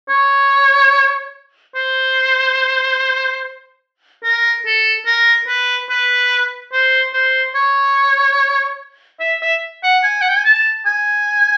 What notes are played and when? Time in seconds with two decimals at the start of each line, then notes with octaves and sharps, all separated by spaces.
0.09 C#5
1.75 C5
4.24 A#4
4.66 A4
5.06 A#4
5.48 B4
5.89 B4
6.73 C5
7.14 C5
7.55 C#5
9.20 E5
9.42 E5
9.83 F#5
10.03 G#5
10.21 F#5
10.29 G5
10.37 G#5
10.45 A5
10.86 G#5